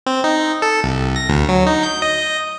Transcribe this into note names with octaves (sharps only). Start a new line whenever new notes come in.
C4
D#4
A4
C2
A#6
D2
F#3
D#4
G6
D#5